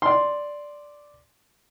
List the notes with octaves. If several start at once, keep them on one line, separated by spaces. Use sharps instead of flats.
D5 C6